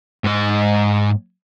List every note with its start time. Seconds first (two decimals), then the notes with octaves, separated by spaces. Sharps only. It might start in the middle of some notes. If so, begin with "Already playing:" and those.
0.24 G#2 D#5